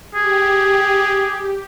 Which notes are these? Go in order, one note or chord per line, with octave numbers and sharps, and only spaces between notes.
G4 G#4